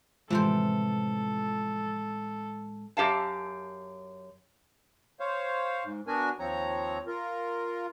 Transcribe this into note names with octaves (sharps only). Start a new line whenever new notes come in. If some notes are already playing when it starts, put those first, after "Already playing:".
A2 C3 E3 F3 G#3 C4 A4 C5
F#2 G4 F5 A5
C5 C#5 F5
G#2
B3 D4 F#4 A#4 G#5
D#2 F3 C4 C#5 A#5
F4 A#4